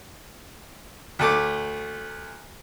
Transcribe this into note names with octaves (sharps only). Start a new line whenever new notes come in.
D2 A3 D6